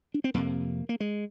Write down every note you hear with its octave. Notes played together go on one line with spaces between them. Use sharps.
D4
C4
F2 C3 A#3
A#3
G#3